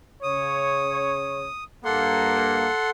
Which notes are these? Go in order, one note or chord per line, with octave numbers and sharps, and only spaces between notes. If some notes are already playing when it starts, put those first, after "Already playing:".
C#3 C#5 D#6
G2 A#3 A4 F#5 C6